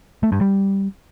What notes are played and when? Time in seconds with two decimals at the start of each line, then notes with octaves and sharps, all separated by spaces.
0.23 A3
0.32 G2
0.41 G3